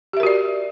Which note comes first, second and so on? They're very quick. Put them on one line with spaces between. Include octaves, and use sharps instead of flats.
G4 E5 A#4 F#4 D5